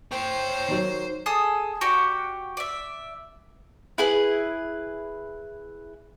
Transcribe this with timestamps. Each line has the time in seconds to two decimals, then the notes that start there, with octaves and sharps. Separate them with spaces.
0.11 C5 C#5 G5
0.68 D#3 F#3
1.26 G#4 A4 G#5 D#6
1.81 F#4 G4 D5 F#5
2.57 D5 E5
3.98 E4 G#4 B4